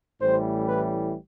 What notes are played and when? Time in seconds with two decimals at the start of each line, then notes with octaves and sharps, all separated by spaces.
0.21 A1 A2 E3 G3 C5
0.68 B4